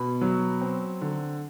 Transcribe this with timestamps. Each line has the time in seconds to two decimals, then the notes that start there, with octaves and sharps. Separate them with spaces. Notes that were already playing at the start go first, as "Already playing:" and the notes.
Already playing: B2 B5
0.21 F#3
0.62 C4
1.01 D3